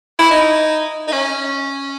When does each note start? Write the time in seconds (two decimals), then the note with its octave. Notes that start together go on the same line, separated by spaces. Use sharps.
0.19 E4
0.31 D#4
1.08 D#4
1.12 C#4